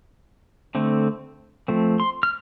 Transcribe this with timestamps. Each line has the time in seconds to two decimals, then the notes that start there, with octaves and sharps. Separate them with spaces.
0.75 D3 A3 C4
1.68 F3 A3 C4
2.00 C6
2.23 F6